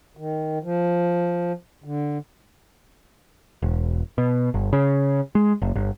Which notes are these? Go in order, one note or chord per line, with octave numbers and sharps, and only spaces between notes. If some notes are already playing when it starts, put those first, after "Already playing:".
D#3
F3
D3
E1
B2
G1
C#3
G#3
F#1
G1